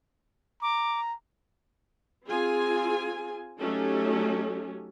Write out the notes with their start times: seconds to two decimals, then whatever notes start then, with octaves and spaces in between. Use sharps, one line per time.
0.62 A#5 D6
2.28 C4 F4 G#4 G#5
3.60 F#3 A3 C#4 D#4 G4 A4